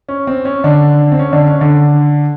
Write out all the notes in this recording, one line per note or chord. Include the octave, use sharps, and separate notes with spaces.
C#4
C4
C#4
D3 D4
C4
C#4
D3 D4
C#4
D3 D4